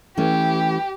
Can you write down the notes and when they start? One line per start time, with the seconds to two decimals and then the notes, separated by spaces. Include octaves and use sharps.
0.17 E3 A3 C#4 G4